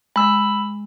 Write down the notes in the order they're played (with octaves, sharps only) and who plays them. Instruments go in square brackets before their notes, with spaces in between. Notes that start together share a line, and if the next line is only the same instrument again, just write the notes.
[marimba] G#3 [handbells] B5 E6